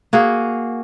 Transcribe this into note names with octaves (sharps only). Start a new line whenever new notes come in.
A#3 F#4 G#4